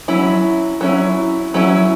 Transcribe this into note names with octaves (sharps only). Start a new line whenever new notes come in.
F#3 C#4 E4
F#3 C#4 E4
F#3 C#4 E4